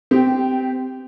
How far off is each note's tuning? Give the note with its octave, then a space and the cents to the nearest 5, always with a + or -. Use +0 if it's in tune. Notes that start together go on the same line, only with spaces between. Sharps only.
C4 -20 G4 +0